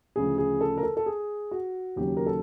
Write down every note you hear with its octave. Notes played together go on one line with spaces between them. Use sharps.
D2 C#3 F3 G#4
G#4
A4
A#4
A4
A4
G#4
F#4
D#2 C#3 F#3 G4
A#4
A4